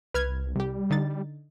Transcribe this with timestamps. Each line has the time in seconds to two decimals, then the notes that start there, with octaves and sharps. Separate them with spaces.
0.14 C2 B4 F6 G#6
0.56 C2 G3 G4
0.90 D3 D#4 A6